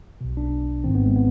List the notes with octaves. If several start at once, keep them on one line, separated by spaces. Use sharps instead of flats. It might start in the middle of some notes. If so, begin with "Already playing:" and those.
B1 B2
D4
G#1 G#2 D#3 C4
B3
G#3
B3